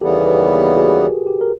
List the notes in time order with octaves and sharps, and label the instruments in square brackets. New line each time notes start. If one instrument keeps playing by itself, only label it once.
[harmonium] D#2 C#3 E3 G3 B3 [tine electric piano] G4 A4
[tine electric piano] B4
G#4 A#4
F#4 G#4
G4
G4
A#4